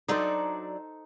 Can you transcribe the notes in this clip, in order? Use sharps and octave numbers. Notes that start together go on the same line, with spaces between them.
F#3 D4 D#4 A4 C5 D5